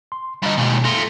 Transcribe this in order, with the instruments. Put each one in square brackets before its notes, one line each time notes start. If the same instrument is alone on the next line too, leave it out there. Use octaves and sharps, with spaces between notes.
[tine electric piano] C6
[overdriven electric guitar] G2 D3 [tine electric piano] D#5 A#5 B5
[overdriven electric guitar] D#2 G#2 [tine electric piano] B2
[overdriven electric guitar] A3 F4 [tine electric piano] A#6